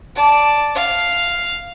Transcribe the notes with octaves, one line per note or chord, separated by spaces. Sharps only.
D5 A5
F5